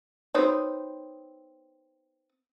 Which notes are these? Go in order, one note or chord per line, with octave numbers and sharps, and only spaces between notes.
B3 C4 D#4 F#4 C5 C#5